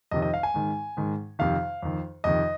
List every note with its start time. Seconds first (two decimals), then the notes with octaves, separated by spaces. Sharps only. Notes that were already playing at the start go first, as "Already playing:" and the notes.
0.11 F2 C3 D#3 D#5
0.22 D#5
0.34 F5
0.43 G#5
0.54 G#2 D#3
0.97 G#2 D#3
1.39 F2 C3 D#3 F5
1.82 F2 D#3
2.24 F2 C3 D#3 D#5